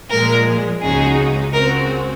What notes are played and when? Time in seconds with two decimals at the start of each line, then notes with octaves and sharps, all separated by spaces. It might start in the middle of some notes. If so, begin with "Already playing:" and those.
0.11 A#2 F3 G#3 A#4
0.82 C#2 C#3 G#3 D#4 F#4 G#4
1.53 C#2 C#3 G#3 C4 F#4 A#4